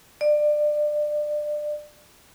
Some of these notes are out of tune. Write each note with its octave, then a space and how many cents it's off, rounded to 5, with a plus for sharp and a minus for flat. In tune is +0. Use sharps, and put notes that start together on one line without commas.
D5 +25